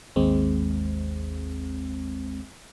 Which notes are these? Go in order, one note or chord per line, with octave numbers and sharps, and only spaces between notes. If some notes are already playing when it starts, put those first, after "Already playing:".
G#1 D#2 G#3 C4